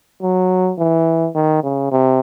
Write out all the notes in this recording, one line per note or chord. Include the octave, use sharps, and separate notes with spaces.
F#3
E3
D#3
C#3
C3